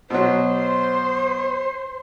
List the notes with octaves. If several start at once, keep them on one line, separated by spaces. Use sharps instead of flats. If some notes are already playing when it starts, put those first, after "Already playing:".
B2 F#3 C5